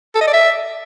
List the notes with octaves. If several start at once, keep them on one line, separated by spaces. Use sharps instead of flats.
A4
D#5
D5
E5